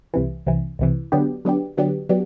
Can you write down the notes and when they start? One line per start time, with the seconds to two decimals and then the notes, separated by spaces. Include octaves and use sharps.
0.14 C2 C3 E3
0.47 C2 C3 E3
0.79 C2 C3 E3
1.12 D3 F#3 B3 D4 G4
1.45 D3 F#3 B3 D4 G4
1.77 D3 F#3 B3 D4 G4
2.09 F#3 B3 D4 G4